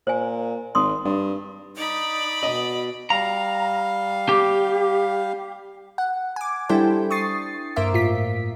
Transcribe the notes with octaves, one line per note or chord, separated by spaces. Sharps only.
A#2 C5 G#5
G#1 C6 D#6
G2
D#4 D5 B5
B2 D#5
G3 F5 A#5
G4
F#5
G#5 D6
G3 D4 E4 A4 C5 G5
C#6 D#6 A6 C7
G2 A#3 A#4 C5 E5 D6
A2 F4 B6